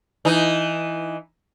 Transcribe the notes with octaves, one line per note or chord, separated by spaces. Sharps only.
E3 D#4